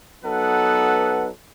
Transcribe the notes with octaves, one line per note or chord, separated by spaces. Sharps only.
F#3 B3 D#4 A4 B4 F#5